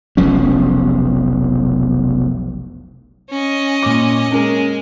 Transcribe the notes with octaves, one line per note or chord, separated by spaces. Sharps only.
F1 B1 F3 C#4
C#4 D#5
A#2 D6
G#3 C#4 A#4